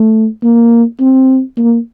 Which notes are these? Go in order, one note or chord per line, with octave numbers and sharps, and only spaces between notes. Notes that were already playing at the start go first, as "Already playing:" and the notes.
Already playing: A3
A#3
C4
A#3